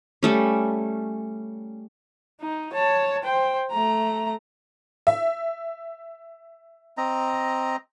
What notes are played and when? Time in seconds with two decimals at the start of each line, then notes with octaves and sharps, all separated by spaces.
0.23 G3 A3 C#4
2.41 D#4
2.73 C#5 A5
3.24 C5 G5
3.71 A3 A#5
5.07 E5
6.98 C4 D#5 A#5